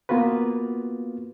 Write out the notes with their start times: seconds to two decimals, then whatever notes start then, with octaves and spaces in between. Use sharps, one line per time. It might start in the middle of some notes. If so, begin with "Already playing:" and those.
0.09 A#3 B3 F4 F#4 B4